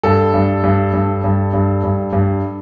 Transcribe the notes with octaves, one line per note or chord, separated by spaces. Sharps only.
G2 A4
G2
G2
G2
G2
G2
G2
G2